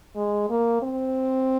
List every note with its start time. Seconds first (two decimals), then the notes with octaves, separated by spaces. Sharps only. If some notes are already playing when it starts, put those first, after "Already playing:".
0.16 G#3
0.50 A#3
0.82 C4